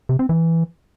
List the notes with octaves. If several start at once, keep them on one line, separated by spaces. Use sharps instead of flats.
C3
C4
E3